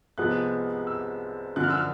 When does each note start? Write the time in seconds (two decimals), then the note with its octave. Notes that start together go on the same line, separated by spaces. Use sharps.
0.18 C2 C3 F3 G#3 B3 F#6
0.87 E6
1.56 F#2 D3 F3 F#6
1.63 F6
1.70 E6
1.78 F6